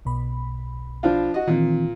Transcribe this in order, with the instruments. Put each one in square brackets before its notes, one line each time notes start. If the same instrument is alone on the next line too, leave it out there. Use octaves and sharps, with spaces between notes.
[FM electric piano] B1 B2 B5
[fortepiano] F3 D4 F4
F#4 D#5
[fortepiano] A#2 [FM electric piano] D#3 E3 C4